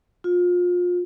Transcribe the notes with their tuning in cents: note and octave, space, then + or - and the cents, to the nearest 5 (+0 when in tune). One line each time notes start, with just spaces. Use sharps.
F4 +30